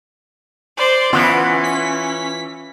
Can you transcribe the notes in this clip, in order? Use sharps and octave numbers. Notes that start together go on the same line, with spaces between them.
C5 D5 C6
E3 B3 C#4 F4
B6